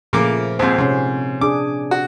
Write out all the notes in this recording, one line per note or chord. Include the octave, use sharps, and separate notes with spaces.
A#2 C#3 F3 A3 A#3 D6
D#2 G#2 C4 C5
G#2 C3 C4 C#4
D4 G#4 D6
F#4